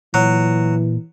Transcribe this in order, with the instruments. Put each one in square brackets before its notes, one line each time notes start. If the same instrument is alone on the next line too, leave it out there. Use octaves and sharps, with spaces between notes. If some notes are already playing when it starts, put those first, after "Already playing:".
[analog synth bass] A#2 [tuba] E3 [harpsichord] F#3